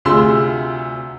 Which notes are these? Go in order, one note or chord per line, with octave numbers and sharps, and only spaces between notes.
D2 C3 F4 G#4 C6 E6